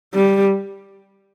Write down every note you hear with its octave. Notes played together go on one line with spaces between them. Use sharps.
G3